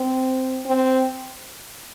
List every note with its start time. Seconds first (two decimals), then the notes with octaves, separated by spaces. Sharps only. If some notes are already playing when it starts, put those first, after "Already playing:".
Already playing: C4
0.66 C4